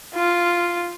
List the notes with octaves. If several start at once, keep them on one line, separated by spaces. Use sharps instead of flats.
F4